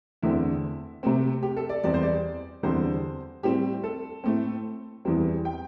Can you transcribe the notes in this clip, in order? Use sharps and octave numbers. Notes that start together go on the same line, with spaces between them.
E2 D3 A3 C4 E4
C3 A3 C4
G4
A4
D5
E2 E3 G3 C4 D5
C5
D5
E2 D3 G3 C4 C5
A2 G3 C4 G4
A4
A2 A3 C4
E2 E3 G3 C4
G5